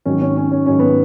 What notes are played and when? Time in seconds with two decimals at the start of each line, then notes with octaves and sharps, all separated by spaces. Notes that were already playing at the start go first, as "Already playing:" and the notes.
0.05 G#2 D#3 F#3 C#4
0.22 C#4
0.37 C#4
0.52 C#4
0.66 G#2 D#3 F#3 C#4
0.79 B3